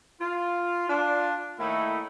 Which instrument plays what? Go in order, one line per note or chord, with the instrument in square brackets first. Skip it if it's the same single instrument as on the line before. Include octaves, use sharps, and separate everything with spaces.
[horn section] F4
D4 F4
A2 D#3 A3 A#3 D#4 E4